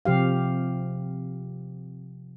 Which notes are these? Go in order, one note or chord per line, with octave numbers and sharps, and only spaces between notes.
C3 F3 G4 F5